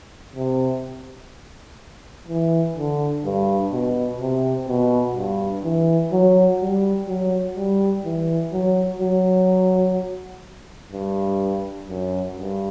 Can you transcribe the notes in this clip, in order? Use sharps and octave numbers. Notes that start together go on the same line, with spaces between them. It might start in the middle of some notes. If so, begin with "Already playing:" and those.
C3
E3
D3
G2
B2
C3
B2
G2
E3
F#3
G3
F#3
G3
E3
F#3
F#3
G2
F#2
G2